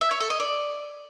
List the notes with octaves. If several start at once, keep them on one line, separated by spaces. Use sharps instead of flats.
E5
C#5
A4
D#5
D5